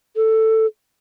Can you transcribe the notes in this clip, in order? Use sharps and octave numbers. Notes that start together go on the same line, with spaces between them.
A4